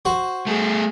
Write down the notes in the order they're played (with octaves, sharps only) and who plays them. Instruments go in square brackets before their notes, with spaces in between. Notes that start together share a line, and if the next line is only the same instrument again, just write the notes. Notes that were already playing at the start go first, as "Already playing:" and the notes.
[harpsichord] F#4 C5
[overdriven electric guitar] A3 G#4